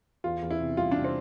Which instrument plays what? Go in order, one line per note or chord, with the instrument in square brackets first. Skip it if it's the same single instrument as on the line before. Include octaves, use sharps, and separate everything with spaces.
[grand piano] E2 [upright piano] F4
[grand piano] E2
[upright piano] E4
[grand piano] C3
[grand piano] G3 [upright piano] F4
[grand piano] C3 [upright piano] D4
[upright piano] C4